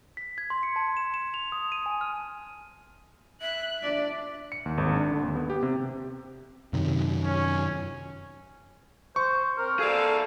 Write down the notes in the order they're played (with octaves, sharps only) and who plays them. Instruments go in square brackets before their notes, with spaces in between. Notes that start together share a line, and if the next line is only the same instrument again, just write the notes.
[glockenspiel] B6
G#6
C6
C#7
A5
E7
E7
F7
D#6
D#7
G#5
F6
[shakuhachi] E5 [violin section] F#6
[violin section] D4 [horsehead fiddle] D5
[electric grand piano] C#7
D#2
G#1
D4
D3
D#2
B3
G4
C3
[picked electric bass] F#2 C3 D#3
[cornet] C#4
[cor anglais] C5 [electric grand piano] C#6
[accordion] C4 [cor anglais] A#4
[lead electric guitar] G#4 D5 [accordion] A4 F5